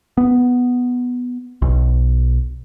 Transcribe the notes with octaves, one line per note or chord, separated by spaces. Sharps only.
B3
B1